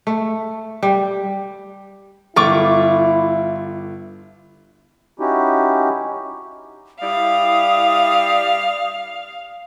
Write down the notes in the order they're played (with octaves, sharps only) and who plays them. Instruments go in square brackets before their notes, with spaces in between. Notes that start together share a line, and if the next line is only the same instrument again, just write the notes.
[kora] A3
G3
[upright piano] G1 [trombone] E4 [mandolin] F4 C#6 D6
[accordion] C#4 D#4 E4 F#4 G4
[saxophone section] G3 E4 [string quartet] F5 [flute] D#6